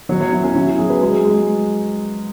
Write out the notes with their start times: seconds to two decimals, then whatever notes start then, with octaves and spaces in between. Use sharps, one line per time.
0.09 F#3 C#5
0.20 C#5
0.32 F#3 E4
0.44 C#4
0.55 F#3 E4
0.67 F#4
0.78 F#3 G#4
0.90 B4
1.01 G#3 G#4
1.25 G#3